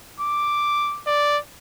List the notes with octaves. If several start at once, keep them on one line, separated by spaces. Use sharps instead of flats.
D6
D5